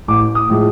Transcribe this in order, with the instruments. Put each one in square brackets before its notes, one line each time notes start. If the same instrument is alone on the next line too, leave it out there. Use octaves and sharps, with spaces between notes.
[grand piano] A1 D6
D#6
A2 F3 G#3